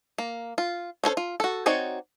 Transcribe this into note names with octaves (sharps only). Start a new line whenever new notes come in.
A#3
F4
C#4 D4 A4 C5
F4
F#4 A4
C4 D#4 F#4 C#5 D5